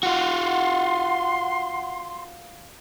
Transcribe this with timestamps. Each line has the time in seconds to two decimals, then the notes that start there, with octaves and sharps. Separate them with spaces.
0.03 F4 F#4 F#5 C6